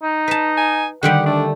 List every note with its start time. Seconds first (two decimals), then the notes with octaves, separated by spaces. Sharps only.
0.02 D#4
0.28 B4 A5
0.57 G#5
1.03 D3 D#3 G3 G4 F#5
1.26 A3 D4